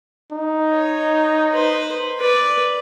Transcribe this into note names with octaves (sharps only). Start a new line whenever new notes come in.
D#4
C#5
B4 C5
B4 D5